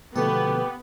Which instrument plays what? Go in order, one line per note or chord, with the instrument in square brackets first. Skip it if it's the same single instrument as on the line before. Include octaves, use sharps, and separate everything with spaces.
[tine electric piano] B2 D3 F3 [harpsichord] A3 A4 [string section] B3 [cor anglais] G4